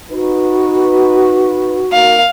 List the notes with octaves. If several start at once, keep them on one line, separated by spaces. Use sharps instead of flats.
D#4 F#4 B4
A#3 D#4 A#4 F5